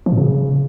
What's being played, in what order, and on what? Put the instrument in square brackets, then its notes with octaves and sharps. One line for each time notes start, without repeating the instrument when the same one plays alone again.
[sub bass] F3
A#2
C#3